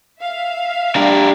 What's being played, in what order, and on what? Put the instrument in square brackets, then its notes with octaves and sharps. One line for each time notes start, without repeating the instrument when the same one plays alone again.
[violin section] E5 F5
[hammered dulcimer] G3 [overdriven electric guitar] D4 A#4